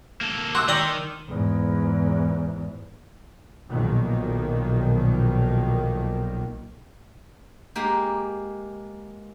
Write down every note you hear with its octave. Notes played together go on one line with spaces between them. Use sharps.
A#3 A4
F#4 C6 D6 E6
D#3 D5 G5 A#5
E2 G#2
B1 A#2 D#3 F3 A#3
G#3 A#3 G4